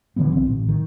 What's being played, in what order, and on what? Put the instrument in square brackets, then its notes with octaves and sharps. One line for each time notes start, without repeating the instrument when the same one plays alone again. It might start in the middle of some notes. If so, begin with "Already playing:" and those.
[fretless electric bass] D3 E3 F#3 B3
B1 C4
A1
D#3